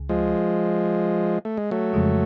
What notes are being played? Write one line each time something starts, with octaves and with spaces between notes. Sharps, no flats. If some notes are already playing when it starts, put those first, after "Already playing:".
Already playing: C#2 C#3
F3 G#3
A3
G#3
F#3 A3
F2 C#3 F3 G#3